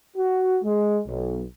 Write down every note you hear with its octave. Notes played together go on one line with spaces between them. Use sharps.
F#4
G#3
B1